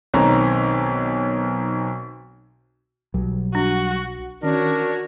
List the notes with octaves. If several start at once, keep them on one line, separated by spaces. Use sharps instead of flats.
B1 D#3 C4 C#5 A#5
B1 F#3 G3
D4 F#4
D#3 C#4 D4 F#4 A#4 C#5